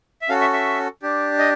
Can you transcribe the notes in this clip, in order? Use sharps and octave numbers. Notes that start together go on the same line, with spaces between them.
E5
C#4 F#4 A4 F5
E5
E5
D4 G4
D#5